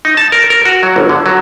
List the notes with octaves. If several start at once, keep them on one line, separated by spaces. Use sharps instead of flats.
D#4
A5
A#4
A#4
F#4
F#3
G1
D3
F#3